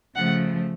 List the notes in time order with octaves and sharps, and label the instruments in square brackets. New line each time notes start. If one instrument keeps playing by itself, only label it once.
[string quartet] C#3 F3 A3 F#5